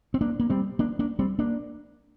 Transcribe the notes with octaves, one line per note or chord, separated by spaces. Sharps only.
C4
A#3 D4
A#3
G3 C4
A#3 D4
A#3 D4
G3 C4
A#3 D4